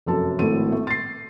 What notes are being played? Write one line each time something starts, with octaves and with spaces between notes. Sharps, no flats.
F1 F#2 A4 A5
G#1 A2 A4 D#7
A3
A6 C7